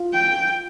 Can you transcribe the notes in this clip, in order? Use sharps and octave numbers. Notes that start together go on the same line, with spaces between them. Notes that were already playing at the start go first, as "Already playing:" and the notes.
Already playing: F4
G5